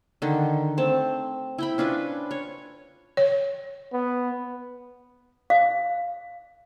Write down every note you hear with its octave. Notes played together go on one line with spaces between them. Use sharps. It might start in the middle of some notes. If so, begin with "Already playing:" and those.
D3 D#3
A3 C4 A5
E4 G5 B5
C#4 D4 F4 B4
C#5
C#5
B3
F5